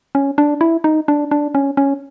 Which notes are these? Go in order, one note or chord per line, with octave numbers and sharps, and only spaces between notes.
C#4
D4
E4
D#4
D4
D4
C#4
C#4